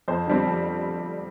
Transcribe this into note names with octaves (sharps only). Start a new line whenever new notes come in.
F2 C5
D3 G3 C4
F2